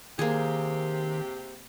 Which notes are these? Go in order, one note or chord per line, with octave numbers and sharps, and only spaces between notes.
C3 D#3 A#3 C4 G4 G#4